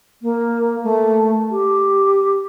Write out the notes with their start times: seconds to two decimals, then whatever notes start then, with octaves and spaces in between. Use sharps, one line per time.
0.22 A#3
0.83 A3
1.51 G4